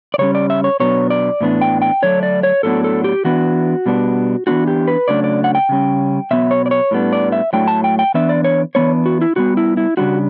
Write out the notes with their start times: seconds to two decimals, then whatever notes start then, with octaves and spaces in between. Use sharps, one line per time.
0.14 D5
0.18 C#3 G3 C#4 C#5
0.35 D5
0.50 E5
0.64 C#5
0.80 B2 F#3 B3 D4 C#5
1.10 D5
1.41 A2 E3 B3 D4
1.61 G5
1.82 G5
2.02 D3 F#3 A3 D4 C#5
2.23 D5
2.43 C#5
2.63 A2 F#3 B3 D4 A4
2.84 A4
3.04 G4
3.25 E3 B3 D4 F#4
3.86 B2 G3 B3 D4
4.47 E3 B3 D4 F#4
4.68 G4
4.88 B4
5.08 C#3 F#3 A3 D4 D5
5.24 D5
5.44 F#5
5.55 G5
5.69 C#3 G3 C#4
6.31 B2 F#3 B3 E5
6.51 C#5
6.66 D5
6.71 C#5
6.91 A2 G3 B3 D4
7.13 D5
7.32 E5
7.53 A2 F#3 A3 D4 G5
7.68 A5
7.84 G5
7.99 G5
8.14 E3 B3 D4 E5
8.29 D5
8.44 C#5
8.75 E3 G3 B3 D4 C#5
9.06 F#4
9.21 E4
9.36 A2 G3 B3 F#4
9.57 E4
9.77 E4
9.97 C#3 G3 D4 F#4